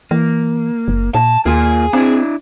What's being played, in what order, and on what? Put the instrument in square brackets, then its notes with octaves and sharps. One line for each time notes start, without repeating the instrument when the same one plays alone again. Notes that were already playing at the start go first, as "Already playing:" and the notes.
[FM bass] E3 [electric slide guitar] A#3
[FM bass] F#1
[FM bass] A#2 [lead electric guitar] A5
[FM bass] D#2 [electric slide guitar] A#3 F4 [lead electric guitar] G#4 G#5
[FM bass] C4 [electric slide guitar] D4 E4